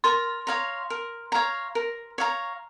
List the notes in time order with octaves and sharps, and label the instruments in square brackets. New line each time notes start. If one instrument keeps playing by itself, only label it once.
[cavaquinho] A#4 [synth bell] C6
[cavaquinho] C#5 F5 A#5
A#4
C#5 F5 A#5
A#4
C#5 F5 A#5